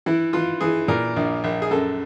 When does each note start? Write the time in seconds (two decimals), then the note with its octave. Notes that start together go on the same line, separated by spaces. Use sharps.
0.06 E3 E4
0.33 E3 F4
0.61 E3 G#4
0.88 A#2 A#4
1.16 A#1
1.44 A#1
1.62 G#4
1.71 F#2 A4